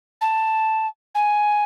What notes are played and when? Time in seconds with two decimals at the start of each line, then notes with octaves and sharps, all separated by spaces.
0.21 A5
1.15 G#5